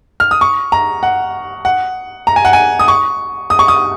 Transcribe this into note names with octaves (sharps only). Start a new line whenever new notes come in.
F6
D#6
C#6
A#5
F#5
F#5
A#5
G#5
F#5
G#5
D#6
C#6
D#6
C#6
D#6